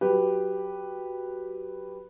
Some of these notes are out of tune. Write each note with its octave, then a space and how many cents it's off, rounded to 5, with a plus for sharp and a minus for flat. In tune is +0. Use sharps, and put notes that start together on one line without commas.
F#3 +0 G4 +0 B4 +0